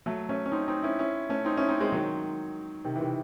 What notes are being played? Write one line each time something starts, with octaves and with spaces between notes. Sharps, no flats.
F#3 A3
A3 C#4
C#4
C4 D#4
C4 D#4
C#4 E4
C#4 E4
A3 C#4
C4 D#4
C#4 E4
C4 D#4
G#3 C4
D#3 F#3
C3 D#3
E3
C3 D#3